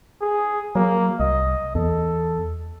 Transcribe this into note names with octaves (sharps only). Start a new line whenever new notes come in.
G#4
F#3 A#3
C2 D#5
E2 A4